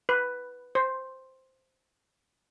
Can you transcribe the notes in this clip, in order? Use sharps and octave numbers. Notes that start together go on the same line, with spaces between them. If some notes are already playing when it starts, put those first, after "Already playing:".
B4
C5